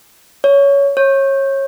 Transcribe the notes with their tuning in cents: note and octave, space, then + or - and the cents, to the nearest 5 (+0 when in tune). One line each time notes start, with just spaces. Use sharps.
C#5 +15
C#5 -25